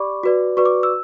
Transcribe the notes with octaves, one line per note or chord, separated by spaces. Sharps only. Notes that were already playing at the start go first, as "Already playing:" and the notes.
Already playing: G4 D5 B5 C#6 D6
F#4 B4 D5
F#4 B4 D5 C#6
D6
E6